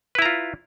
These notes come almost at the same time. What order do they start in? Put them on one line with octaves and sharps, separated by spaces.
B4 E4 A#5 F4